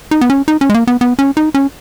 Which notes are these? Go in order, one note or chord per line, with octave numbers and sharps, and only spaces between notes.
D#4
B3
C#4
D#4
C#4
G#3
A#3
B3
B3
C#4
D#4
C#4